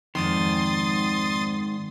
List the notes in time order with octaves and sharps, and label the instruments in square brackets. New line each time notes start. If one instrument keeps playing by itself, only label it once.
[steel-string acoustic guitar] F2 D5 [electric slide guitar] G#2 D#3 [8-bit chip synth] C6 D#6 A6